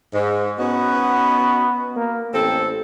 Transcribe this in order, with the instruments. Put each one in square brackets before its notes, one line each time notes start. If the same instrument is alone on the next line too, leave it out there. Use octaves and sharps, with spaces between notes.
[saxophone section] G#2
[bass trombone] B3 [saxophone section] C#4 D#4 F#4
[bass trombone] A#3
[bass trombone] A1 [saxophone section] C4 A4